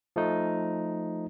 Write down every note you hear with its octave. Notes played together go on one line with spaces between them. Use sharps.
F3 A3 D#4